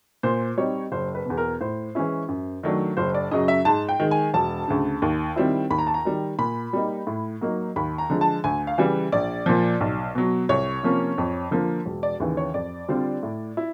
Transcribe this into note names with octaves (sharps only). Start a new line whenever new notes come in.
A#2 C5
G3 C4 D#4 C#5
F#1 C5
B4
E2 B2
A#4
A2 C5
E3 G#3 C#4 E4
F#2
D#3 F#3 A3 D4
F#1 C5
D5
F#2 C#3 F#3 D#5
E5
G#2 A5
G5
D#3 G#3
G#5
E1 A5
D2 C#3
D#2
D#3 G3 C4 E4
D#2 B5
A#5
A5
A#5
D#3 G3
A#2 B5
G3 A#3 D#4
A2
F#3 A#3 D#4
D#2 B5
A#5
D3 F3 G#3
A5
D2 G#5
F5
C#3 E3 G3
A#1 D5
A#2 F3
B1
B2 F#3
C2 C#5
C3 F3 A#3 C#4
F2
D3 F3 A#3
E1
D5
D#2 C#3 E3
C#5
F2 D5
D3 G3 C4 F4
A2
E4